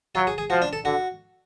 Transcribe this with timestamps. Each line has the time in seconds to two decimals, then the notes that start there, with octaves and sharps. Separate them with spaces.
0.15 F#3 F4
0.27 G#4
0.38 G#4
0.50 F3 F#4
0.62 D4
0.73 A4
0.85 D3 F#4